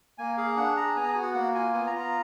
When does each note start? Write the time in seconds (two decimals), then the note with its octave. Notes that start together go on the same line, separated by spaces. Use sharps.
0.18 A#3 G#5
0.37 G#4 F5
0.56 D4 F#5
0.77 G#4 A#5
0.96 B3 G#5
1.04 A#5
1.09 G#5
1.15 F#4
1.22 F#5
1.35 A#3 F#5
1.55 F4 G#5
1.73 B3 G#5
1.87 A#5
1.93 F4
1.99 A#5